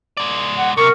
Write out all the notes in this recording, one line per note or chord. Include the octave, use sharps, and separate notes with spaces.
G#3 D5
F#5
C3 A#4 C#6